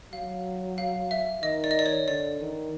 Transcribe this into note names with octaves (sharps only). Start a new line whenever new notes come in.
F#3 F5
F5
E5
D#3 D#5
D5
D#5
D5
C#5
D3 D5
D#3